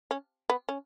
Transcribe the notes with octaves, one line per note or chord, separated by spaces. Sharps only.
C#4
B3
C#4